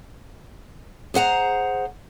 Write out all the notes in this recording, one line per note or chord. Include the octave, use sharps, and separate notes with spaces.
G#4 C5 F#5 A#5